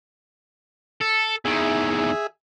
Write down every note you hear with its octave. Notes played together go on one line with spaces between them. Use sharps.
A4
E2 D#3 G#4 E5